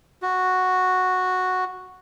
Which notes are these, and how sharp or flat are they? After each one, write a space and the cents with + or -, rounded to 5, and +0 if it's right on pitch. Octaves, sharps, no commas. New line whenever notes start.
F#4 -5